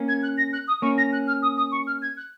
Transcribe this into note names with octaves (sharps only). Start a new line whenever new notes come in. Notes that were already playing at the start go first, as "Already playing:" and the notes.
Already playing: A#3 C#4
G#6
F#6
A#6
F#6
D#6
A#3 C#4 C#6
A#6
F#6
F6
D#6
D#6
C#6
F6
G#6
F#6